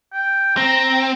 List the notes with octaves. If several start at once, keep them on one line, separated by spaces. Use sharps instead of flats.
G5
C4 A#5